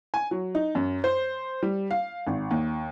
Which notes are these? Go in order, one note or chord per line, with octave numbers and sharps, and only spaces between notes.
G#5
F#3
D#4
F#2
C5
G3
F5
G#1
D#2